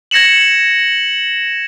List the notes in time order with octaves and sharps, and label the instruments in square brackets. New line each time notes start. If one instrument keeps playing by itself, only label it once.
[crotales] G#6 A#6 C#7 E7 F#7